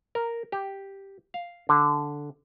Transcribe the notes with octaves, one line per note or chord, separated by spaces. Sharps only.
A#4
G4
F5
D3